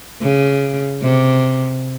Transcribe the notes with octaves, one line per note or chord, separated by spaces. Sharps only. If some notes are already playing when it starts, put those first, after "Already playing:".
C#3
C3